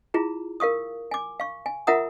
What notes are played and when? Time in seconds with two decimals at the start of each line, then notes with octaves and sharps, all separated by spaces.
0.14 E4 F4 G#4 A#5
0.60 A#4 F5 C#6 D#6
1.11 G#5 D6
1.40 F5 C#6
1.66 G#5
1.87 F4 A#4 E5 F#5 A#5 D#6